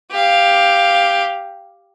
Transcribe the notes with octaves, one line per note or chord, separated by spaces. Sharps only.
G4 F5